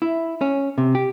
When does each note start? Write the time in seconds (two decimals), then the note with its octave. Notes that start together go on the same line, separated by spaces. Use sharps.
0.02 E4
0.41 C#4
0.78 C3
0.95 G4